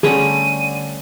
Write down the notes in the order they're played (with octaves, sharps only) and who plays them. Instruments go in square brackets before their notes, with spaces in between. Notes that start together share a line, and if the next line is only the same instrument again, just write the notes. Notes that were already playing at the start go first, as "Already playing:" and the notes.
[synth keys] D3 [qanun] G3 A3 C#4 [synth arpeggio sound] G#4 [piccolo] D#7